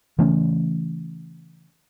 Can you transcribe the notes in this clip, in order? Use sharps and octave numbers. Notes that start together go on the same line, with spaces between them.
C#3 E3 A3 C#4